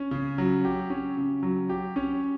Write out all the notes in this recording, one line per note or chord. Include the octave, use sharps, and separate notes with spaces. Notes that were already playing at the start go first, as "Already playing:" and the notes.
Already playing: C#4
C#3
F#3
G4
C#4
C#3
F#3
G4
C#4